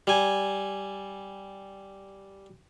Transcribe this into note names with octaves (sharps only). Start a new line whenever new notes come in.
G3 G#5